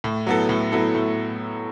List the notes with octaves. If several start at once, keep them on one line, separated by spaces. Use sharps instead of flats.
A2
F#3 B3 E4 A4
A2
F#3 B3 E4 A4
A2